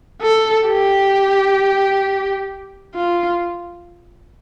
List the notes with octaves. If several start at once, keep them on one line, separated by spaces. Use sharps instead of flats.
A4
G4
F4